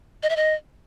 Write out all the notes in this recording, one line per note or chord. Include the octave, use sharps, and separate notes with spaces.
D#5
E5
D#5